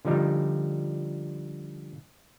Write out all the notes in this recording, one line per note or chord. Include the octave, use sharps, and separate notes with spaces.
D3 F3 G3 D#4